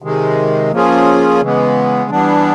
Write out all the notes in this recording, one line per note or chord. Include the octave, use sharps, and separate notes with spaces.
C3 D#3 G#3
F3 A#3 C#4 F4 G#4
C#3 E3 G#3 B3
E3 G3 B3 D4